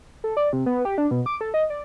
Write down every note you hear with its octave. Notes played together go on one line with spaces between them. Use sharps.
A4
D5
C3
B3
G4
D4
B2
D6
A4
D#5
D5